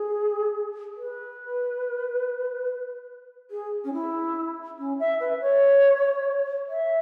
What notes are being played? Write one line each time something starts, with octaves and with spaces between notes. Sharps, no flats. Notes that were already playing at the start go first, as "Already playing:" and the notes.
Already playing: G#4
B4
G#4
C#4
E4
C#4
E5
B4
C#5
E5